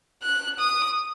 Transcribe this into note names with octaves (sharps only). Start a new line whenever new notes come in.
F#6
D#6